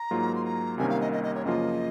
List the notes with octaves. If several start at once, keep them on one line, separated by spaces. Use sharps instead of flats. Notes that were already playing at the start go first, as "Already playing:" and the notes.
Already playing: A#5
G#2 F#3 A#3 F4
C6
A#5
C2 C3 D#3 A#3 C#4 G#5
F5
D#5
D#5
D#5
C#5
F#2 C#3 F3 A#3 F4 D#5